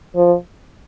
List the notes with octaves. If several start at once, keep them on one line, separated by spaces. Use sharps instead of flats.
F3